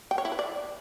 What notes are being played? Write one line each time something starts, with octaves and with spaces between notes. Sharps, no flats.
G5
C#5
E4
B4
D5